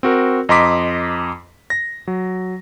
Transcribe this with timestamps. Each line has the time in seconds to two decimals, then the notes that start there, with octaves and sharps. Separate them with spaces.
0.03 C4 F#4 A#4
0.49 F2 D#5 A#5 C6 D6 B6
1.70 A#6
2.07 F#3